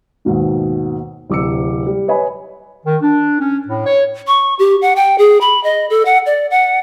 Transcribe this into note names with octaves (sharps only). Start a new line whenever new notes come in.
D#2 G#2 B2 D#3
D1 C3 D6 E6 C#7
G3
B4 C#5 D#5 G#5 B5
D#3
D4
C#4
A2
C#5
C#6
G4
F#5
G5
G#4
B5
D#5
A4
F#5
D5
F#5